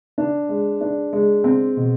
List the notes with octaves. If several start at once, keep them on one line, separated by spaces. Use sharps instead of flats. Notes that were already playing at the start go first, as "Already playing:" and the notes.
D4
G#3
D4
G#3
C4
B2